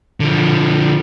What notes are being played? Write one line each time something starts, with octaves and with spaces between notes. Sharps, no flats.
D3 F3